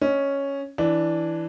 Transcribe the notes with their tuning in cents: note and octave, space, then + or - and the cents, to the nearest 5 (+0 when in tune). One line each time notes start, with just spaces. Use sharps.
C#4 +0 D#5 +0
E3 +0 D4 +0